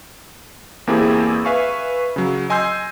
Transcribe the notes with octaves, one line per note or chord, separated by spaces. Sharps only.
E2 A#3 C4 E4 G4 G#4
B4 E5 F5 G#5 C#6
C#3 F#3
D#5 G#5 C6 E6 G6 C7